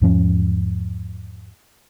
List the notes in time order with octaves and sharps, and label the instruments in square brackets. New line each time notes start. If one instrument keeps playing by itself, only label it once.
[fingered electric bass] E2 G#2 F3 C#4